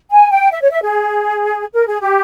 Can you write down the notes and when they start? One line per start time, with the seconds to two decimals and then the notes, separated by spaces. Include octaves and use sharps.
0.10 G#5
0.30 G5
0.51 E5
0.61 C#5
0.71 E5
0.82 G#4
1.73 A#4
1.87 G#4
2.00 G4